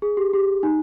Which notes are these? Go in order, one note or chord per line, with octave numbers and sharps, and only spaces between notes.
G#4
G4
G4
D#4